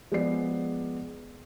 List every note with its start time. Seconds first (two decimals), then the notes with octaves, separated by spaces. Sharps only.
0.11 F3 G#3 B3 G#4 D5 C7